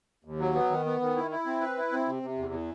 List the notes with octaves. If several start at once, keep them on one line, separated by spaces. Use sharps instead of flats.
D#2
F#3
B3
D#3
B3
D#3
E4
E4
C4
B4
E4
C4
C3
C3
E2
E3